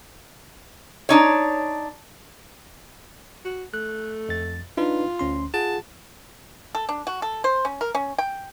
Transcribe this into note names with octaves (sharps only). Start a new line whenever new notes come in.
D4 D#4 C#5
F#4
A3 F#6
F2 A6
D4 D#4 F4 B4
D2 C#4 C6
F4 G#4 F#5 A5
A4
D4
F#4
A4
C5
C#4
A#4
C#4
G5